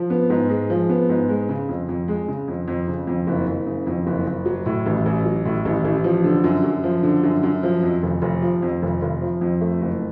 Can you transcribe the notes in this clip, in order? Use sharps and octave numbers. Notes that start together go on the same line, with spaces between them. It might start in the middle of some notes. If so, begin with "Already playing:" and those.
Already playing: F3
B3
G#2
G#3
F3
B3
G#2
G#3
C#3
F2
F2
G#3
C#3
F2
F2
C#3
F2
F#1
F#1
C#3
F2
F#1
F#1
F#3
A2
A1
A1
F#3
A2
A1
A1
F3
D3
F#2
F#2
F3
D3
F#2
F#2
F3
F2
F1
F1
F3
F2
F1
F1
F3
F2
A3
F#1